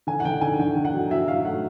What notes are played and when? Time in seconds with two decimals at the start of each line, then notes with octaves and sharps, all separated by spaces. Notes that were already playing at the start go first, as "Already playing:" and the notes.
0.07 D3 G#5
0.20 F#5
0.25 D3 G5
0.41 D3 G#5
0.59 D3 G5
0.76 D3
0.85 F#5
0.94 F#3
1.10 F#3 E5
1.28 F#3 F5
1.45 A3 F#5